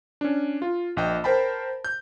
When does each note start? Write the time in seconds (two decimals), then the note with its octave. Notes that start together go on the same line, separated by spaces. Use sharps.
0.21 C#4 D4
0.62 F4
0.97 A#1 D#5 G5
1.24 A#4 C5 G5 A5 B5
1.85 G6